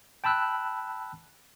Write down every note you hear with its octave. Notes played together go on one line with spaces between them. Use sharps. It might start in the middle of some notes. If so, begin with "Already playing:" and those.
G5 A5 B5 E6 F#6